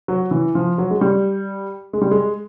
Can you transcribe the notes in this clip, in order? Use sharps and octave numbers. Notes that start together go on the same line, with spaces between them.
F#3
E3
F3
F#3
G#3
G3
G#3
G3
G#3